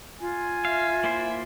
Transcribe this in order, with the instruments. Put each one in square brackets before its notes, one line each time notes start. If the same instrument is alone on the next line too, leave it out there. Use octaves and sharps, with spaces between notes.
[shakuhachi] F4 [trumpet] G#5
[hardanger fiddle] E5 [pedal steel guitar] F5
[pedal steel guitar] A#3 E4 C5